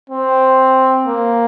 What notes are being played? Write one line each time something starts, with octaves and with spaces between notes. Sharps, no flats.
C4
A#3